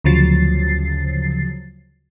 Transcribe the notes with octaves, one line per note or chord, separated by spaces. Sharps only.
D2 C#3 F3 F#3 A6 C7